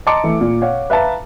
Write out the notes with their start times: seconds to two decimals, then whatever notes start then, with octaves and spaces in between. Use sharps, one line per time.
0.06 D#5 A5 A#5 C6 D6 C#7
0.24 E3 A3
0.41 A#2
0.61 C#5 F5 F#5
0.90 B4 E5 F5 A5 A#5